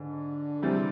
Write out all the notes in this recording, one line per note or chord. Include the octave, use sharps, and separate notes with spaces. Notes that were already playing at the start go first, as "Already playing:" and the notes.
Already playing: G#2 D3
C3 E3 G3 C4